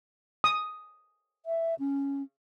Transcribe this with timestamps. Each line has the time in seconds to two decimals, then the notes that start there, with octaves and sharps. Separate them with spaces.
0.44 D#6
1.46 E5
1.79 C#4